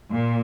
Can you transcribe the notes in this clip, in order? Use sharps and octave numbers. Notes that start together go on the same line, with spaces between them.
A#2